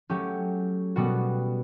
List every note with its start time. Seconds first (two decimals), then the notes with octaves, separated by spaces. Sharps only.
0.10 F#3 A3 C#4 G4
0.96 B2 G3 B3 F#4